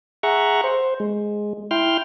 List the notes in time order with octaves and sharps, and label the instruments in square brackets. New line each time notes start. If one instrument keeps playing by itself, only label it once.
[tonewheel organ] G#4 E5 F#5 A#5 C#6
C5
G#3
E4 G5 C6 F6